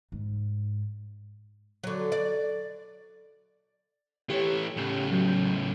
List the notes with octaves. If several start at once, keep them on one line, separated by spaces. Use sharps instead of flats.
G#2
D3 F#3
D5
E3 A3 G4 C#5
A2 C#3
F#3 G6